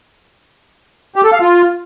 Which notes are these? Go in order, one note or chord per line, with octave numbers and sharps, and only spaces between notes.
G4
A4
F5
F4